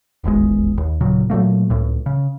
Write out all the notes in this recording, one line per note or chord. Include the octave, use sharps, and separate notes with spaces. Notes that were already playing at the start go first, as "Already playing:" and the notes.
D#1 G#1 E2 G#3
D#2
D#1 A#2 C#3 F#3
A#2 F#3 A3 A#3
C#2 A2
C#3